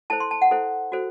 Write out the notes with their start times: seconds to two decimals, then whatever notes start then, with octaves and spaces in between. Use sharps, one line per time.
0.10 E4 A4 C5 A5
0.20 C6
0.31 A5
0.42 F#5
0.51 E4 A4 C5
0.92 F#4 A4 C5